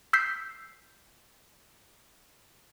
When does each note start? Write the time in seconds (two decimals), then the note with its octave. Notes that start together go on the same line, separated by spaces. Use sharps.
0.13 E6 G6 B6 C7